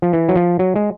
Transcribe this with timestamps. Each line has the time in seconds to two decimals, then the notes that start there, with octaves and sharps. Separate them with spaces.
0.02 F3
0.13 E3
0.29 F#3
0.36 F3
0.59 F#3
0.76 G#3